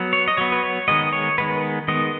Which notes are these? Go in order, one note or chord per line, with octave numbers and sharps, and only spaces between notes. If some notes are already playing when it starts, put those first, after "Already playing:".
Already playing: F#3 B3
C#5
D#5
F#3 B3 C#5
B4
C#5
D#3 G#3 B3 D#5
C#5
D#3 G#3 B3 B4
D#3 G#3 B3 D#5